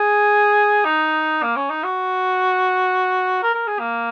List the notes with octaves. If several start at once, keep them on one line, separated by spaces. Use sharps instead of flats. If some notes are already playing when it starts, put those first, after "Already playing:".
Already playing: G#4
D#4
A#3
C#4
D#4
F#4
A#4
A#4
G#4
A#3